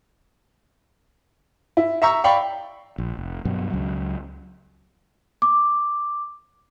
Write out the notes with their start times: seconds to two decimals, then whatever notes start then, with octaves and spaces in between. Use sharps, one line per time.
1.77 E4
2.02 E5 A#5 C#6 E6
2.24 D5 F5 G5 B5 C#6
2.98 A#1
3.17 F1
3.45 G2 B2 F#3
3.70 C#2 F#3
5.42 D6